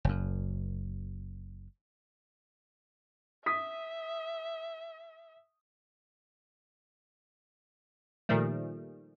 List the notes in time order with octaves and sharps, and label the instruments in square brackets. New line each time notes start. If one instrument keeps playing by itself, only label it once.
[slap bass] F#1 F#2
[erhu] E5 [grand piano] D#6 B6
[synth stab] A#2 D#3 F3 G3 A3